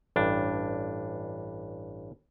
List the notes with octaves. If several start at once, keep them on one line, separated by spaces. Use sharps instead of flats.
A1 G2 D4